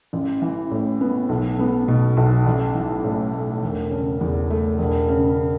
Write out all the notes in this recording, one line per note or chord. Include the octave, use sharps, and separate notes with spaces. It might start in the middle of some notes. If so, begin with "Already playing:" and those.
A1
E3
A2
B3
B1
B3
B2
B1
A1
E3
A2
A3
E1
C#3
E2
A3
E1
C#3